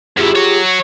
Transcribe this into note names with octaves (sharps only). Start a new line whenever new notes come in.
F#2 E4 F4 G4 G#4
F#4 C#5